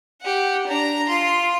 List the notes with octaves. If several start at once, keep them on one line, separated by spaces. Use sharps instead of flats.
G4 F#5
D4 A#5
F4 C6